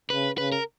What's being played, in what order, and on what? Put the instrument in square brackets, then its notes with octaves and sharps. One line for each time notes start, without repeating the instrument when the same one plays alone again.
[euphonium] C#3 [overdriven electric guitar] B4
[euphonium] C#3 [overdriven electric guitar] B4
[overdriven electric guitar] A#4